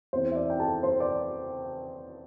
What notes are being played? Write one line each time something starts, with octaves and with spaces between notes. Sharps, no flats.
E2 E3 C4 C5
E5
D5
G5
A4 A5
C5 C6
D5 D6